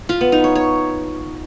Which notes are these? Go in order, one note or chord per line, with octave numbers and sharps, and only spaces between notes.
F4
B3
D#4
C#5
C#5